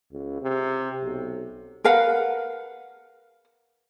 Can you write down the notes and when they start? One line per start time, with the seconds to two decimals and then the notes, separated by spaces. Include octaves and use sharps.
0.12 C#2
0.42 C3
1.03 B1
1.84 A#4 B4 F5 F#5